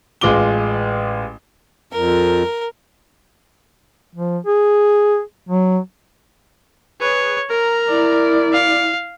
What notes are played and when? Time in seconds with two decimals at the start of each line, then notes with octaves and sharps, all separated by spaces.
0.21 A1 G#3 F4 D6 G7
1.93 F2 A#4
4.15 F3
4.47 G#4
5.49 F#3
7.01 G#4 B4 C#5
7.50 A#4 A#5
7.89 E4 D5
8.53 F5